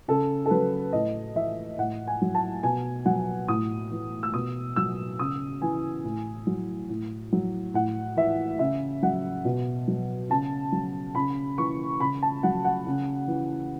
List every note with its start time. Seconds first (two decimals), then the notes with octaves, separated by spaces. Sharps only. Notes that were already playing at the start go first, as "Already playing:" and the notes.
0.08 C#3 A4
0.46 A4
0.50 F#3 B4
0.93 A2 D#5
1.36 E3 E5
1.78 A2 F#5
2.07 G#5
2.22 F#3
2.35 A5
2.63 B2 G#5
3.06 F#3 F#5
3.48 A2 D#6
3.92 E3
4.23 E6
4.34 B2 D#6
4.76 F#3 E6
5.19 C#3 D#6
5.61 E3 G#5
6.04 A2
6.47 F#3
6.89 A2
7.33 F#3
7.74 A2 F#5
8.17 E3 E5
8.59 C#3 E5
9.02 F#3 F#5
9.45 B2
9.88 F#3
10.30 C#3 A5
10.72 F#3
11.15 C#3 B5
11.58 E3 C#6
12.00 C#3 B5
12.22 A5
12.43 F#3 F#5
12.65 F#5
12.86 C#3
13.28 E3